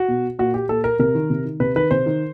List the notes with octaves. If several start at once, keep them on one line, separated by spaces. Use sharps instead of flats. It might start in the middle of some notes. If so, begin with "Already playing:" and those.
Already playing: F#4
B2
A#2 F#4
G4
A#2 A4
A#4
C3 A#4
D#3
C3
D#3
C3 B4
D#3 B4
C3 C5
D#3